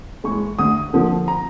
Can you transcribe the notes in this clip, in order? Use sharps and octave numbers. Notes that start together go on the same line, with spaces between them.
A2 E3 G#3 C#6
D2 D#6
D3 F3 A#3
A#5